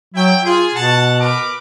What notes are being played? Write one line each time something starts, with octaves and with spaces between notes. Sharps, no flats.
F#3 E4 G5
F4 G#4
B2 F#5 A5
A#4 B4 D6